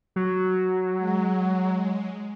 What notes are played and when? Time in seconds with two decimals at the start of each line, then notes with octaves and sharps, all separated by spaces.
0.16 F#3
0.98 G#3